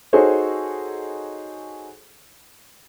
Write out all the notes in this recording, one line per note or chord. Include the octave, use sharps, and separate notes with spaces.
D#4 F#4 G#4 A4 C5 C#5